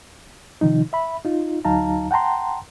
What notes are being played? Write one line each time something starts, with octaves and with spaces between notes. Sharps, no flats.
C3 D#3 F3 D#4
E5 B5
D#4 F4
D2 F#3 D#4 F5 A5 A#5
F#5 G5 A5 A#5 C6